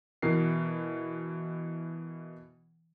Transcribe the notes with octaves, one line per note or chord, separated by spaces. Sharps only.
B2 E3 A#4 C7